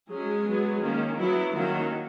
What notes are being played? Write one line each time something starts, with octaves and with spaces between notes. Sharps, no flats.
F#3 G#3 C#4 G#4
F#3 B3
D#3 A#3 C#4
F#3 B3 E4
D#3 F#3 A#3 C#4 F#4